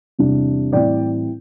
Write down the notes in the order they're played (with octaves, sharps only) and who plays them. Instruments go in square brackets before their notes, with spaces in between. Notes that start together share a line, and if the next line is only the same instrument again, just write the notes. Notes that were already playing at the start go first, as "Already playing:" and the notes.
[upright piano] E2 C3 G3 D4
A2 E3 G3 C4 E4 D5 G5